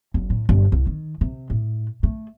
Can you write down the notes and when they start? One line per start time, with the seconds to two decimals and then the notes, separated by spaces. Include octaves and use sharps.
0.14 F#1
0.30 A2
0.49 G1
0.72 C2
0.87 D#3
1.21 C3
1.50 A2
2.03 A3